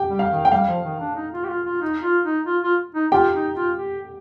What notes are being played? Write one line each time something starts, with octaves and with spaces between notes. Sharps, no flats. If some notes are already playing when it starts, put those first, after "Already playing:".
Already playing: G4 G5
G3
F5
D#3
G5
G3 F5
F3
D#3
D4
D#4
F4
G4
F4
F4
D#4
F4
D#4
F4
F4
D#4
F4 G4 G5
D#4
F4
G4